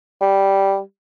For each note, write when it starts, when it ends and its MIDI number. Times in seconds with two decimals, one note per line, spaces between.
0.21 0.79 55